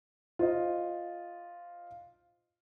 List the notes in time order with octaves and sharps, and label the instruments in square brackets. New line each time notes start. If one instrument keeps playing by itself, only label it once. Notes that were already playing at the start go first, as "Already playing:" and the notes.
[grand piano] F4 C5 D#5